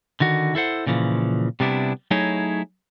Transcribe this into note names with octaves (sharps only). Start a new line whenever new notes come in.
D3 D#3 F#4
E4 A4 C5 F#5
A#2 C#3 E3 F3
C3 G3 B3 D4 E4
F#3 A3 D#4 E4 G#4 C#5